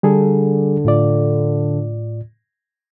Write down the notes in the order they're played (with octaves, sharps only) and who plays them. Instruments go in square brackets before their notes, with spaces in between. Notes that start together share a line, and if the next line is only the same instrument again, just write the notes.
[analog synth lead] D3 [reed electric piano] G3 G#4 A4
[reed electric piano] A2 F4 D5